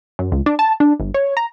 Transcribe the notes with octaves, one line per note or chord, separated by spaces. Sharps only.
F#2
C#2
D4
A5
D4
G1
C#5
A#5